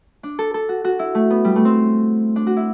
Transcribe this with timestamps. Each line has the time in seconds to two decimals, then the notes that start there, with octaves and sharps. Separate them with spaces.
0.23 D4
0.39 A4
0.54 A4
0.69 F#4
0.84 F#4
0.99 E4
1.15 A3
1.30 B3
1.45 G3
1.56 A3
1.65 C4
2.36 D4
2.47 F#4
2.57 E4